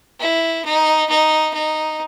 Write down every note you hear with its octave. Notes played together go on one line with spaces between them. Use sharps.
E4
D#4
D#4
D#4